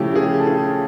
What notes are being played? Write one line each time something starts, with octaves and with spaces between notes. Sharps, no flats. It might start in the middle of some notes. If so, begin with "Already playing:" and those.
Already playing: C#3 F3 A3 C#4 E4 G4
G4
G#4
A4
G#4